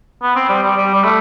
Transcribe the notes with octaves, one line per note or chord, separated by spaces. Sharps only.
B3
C4
G3
G3
G3
G3
A3